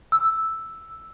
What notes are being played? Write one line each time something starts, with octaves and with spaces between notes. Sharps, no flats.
E6